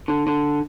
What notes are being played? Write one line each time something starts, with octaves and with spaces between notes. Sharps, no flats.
D3
D3